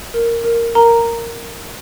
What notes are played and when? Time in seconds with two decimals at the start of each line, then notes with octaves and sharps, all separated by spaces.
0.14 A#4
0.45 A#4
0.75 A#4 A#5